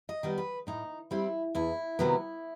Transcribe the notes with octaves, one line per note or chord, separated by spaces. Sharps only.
D#5
D#3 G3 B3
B4
A2 D#4
G3 C4 E4
E2 E4
C3 D#3 F#3 B3